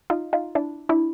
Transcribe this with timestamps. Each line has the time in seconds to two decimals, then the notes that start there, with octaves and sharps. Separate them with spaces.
0.10 D#4 F4
0.33 D#4 F4
0.55 D4 E4
0.89 D4 E4